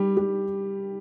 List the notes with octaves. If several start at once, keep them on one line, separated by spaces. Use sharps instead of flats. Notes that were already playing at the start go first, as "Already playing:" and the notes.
Already playing: G3 G4
G3 G4